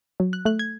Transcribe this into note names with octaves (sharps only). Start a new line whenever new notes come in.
F#3
F#6
A3 F#6
G#6